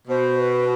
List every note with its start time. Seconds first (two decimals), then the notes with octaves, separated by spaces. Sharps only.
0.08 B2 C5
0.39 B4